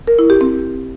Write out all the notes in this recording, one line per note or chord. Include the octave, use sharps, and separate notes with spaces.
A#4
E4
G4
C4